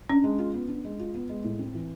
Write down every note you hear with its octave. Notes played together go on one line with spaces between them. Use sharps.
C#4 D4
G#3
F4
B3
D4
G#3
F4
B3
G#3
A2
C4
E3